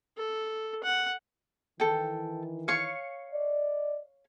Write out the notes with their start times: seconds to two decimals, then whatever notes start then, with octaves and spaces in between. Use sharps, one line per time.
0.17 A4
0.83 F#5
1.80 D#3 E3 A4 G5
2.68 C#5 F5 C#6
3.32 D5 D#5